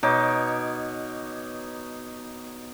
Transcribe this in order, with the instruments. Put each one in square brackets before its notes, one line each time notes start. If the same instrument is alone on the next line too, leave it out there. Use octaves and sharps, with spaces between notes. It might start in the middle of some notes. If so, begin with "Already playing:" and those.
[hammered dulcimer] B2 D#4 C#5 D6